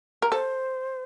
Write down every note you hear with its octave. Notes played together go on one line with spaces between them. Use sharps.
A#4
A4 C5